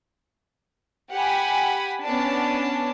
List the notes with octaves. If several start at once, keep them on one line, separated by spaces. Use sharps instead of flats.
G4 F#5 G#5 B5
B3 C#4 D4 A5